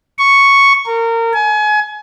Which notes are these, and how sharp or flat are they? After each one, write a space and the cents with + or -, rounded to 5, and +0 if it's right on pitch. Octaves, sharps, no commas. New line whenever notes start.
C#6 +0
A#4 -25
G#5 +30